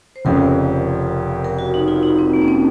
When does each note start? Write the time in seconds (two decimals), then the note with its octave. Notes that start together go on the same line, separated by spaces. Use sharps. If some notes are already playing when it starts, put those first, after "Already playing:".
0.16 C5
0.25 F1 F2 C#3 A#4
1.44 A#4
1.58 F#4
1.74 D#4
1.88 F4
2.03 D#4
2.19 C4
2.33 A#3
2.42 C#4
2.48 C4